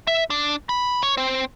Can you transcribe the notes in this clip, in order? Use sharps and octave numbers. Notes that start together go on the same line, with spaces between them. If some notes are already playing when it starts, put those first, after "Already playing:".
E5
D4
B5
C#5
C4